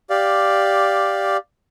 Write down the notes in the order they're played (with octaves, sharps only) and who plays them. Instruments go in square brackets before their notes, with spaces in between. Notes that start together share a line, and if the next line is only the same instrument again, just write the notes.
[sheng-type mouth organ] G4 D5 F5